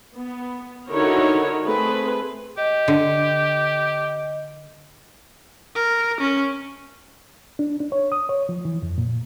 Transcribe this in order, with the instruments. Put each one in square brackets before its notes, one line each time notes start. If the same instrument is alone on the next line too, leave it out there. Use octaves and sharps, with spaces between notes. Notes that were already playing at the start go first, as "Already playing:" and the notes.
[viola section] B3
D3 D#4 E4 F#4 A#4 C#5
A3 C4 G#4 B4
[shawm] G4 [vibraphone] D#5
[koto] D3
[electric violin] A#4
C#4
[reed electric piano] D4
D4
C#5
D#6
C#5
F3
E3
F2
A#2